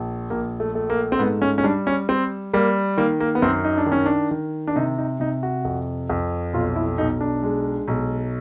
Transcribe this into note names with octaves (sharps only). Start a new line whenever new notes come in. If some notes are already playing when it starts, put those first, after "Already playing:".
Already playing: A#1
A#1 A#3
A3
A3
A#3
C4
G#2 B3
C#4
C#4
G3 D4
C#4
G3 C4
G3 A#3
D#3 A#3
A#3
B3
F#2 C4
D#4
D4
D#3
C#4
D4
D#3
D4
C3 D#4
D#4
C3 D#4
F#4
F2
F2
B1 F4
E4
B1 D#4
D4
G#3
B1